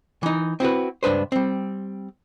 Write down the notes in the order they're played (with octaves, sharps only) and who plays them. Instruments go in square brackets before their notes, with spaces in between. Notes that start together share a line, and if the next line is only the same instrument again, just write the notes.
[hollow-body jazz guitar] E3 D#4
C4 E4 F#4 B4
C#2 G2 D4 B4 C5
G3 C4